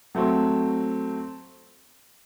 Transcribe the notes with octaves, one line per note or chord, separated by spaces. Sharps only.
F#3 A3 C4